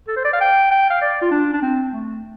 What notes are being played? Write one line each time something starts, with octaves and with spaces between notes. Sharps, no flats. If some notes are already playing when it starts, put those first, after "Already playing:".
A4
C5
D5
F5
G5
G5
F5
D5
F4
D4
D4
C4
A3